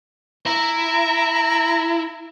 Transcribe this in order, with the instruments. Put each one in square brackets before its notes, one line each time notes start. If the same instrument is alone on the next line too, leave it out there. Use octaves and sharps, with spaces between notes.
[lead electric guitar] E4 [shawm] A#5